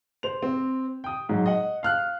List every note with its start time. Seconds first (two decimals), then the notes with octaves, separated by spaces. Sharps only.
0.23 C5 F7
0.42 C4
1.04 G5 D#6
1.29 G#2 F#3
1.46 D#5 F#5
1.83 F5 F6 F#6